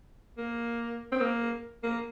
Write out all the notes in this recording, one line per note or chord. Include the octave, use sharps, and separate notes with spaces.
A#3
C4
A#3
A#3